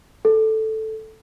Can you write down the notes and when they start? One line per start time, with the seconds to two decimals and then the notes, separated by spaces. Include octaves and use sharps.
0.25 A4